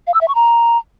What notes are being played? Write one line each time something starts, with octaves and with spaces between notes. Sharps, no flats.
F5
E6
E5
C#6
A#5